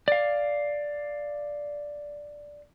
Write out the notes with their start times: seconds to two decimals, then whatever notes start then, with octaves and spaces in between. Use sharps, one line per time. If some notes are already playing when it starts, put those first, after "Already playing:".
0.08 D5 F5